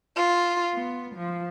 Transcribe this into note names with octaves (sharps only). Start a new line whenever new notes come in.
F4
B3
F3